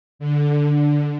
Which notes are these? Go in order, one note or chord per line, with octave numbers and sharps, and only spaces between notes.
D3